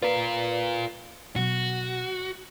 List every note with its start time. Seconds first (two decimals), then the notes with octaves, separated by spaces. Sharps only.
0.02 F4 A#4 B4 D5
1.36 B2 F#3 F#4